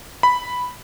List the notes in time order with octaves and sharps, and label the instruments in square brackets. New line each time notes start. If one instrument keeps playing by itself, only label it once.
[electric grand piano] B5